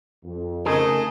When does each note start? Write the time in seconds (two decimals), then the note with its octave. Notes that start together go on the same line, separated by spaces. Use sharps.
0.25 F2
0.66 C#3 A3 D#4 G#4 A#4 D#5